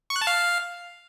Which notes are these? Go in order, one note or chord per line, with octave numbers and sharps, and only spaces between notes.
C#6
F#6
A5
F5